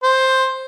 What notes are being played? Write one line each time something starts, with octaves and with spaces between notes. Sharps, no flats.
C5